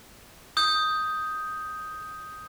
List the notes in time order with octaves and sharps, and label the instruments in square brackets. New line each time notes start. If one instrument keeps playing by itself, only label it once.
[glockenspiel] D#6 G6